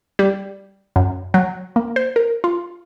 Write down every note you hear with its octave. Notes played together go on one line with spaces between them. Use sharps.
G3
F#2
F#3
A#3
C5
A#4
F4